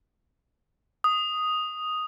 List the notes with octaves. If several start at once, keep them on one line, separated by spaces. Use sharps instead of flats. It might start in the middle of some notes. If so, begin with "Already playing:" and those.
D#6